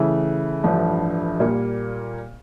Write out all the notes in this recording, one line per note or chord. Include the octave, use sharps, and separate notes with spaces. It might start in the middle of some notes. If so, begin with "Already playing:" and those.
Already playing: C#3 E3 A3
A1 G2 F3 A3 D4
A#2 G3 A#3